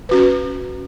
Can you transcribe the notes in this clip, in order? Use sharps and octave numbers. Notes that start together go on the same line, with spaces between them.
C#4 F#4 B4